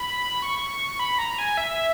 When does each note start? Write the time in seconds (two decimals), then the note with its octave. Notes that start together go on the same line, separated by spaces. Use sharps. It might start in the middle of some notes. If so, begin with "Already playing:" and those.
Already playing: B5
0.42 C#6
0.99 B5
1.19 A#5
1.38 G#5
1.57 E5